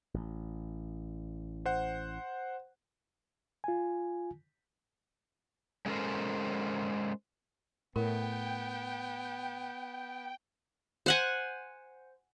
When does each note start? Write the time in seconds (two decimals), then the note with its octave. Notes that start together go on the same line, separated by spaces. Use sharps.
0.14 A1
1.66 C5 F#5
3.64 F4 G#5
5.86 G#3 C#4 A4 A#4 C5
7.96 A2 B3 A#4 G5
11.06 C5 F#5 G#5